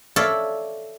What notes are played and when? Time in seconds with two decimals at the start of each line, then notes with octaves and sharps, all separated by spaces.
0.16 A4 C#5 D5 E5 F5